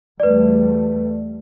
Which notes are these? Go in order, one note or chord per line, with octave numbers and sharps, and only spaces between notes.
E2 G3 A3 B4 D5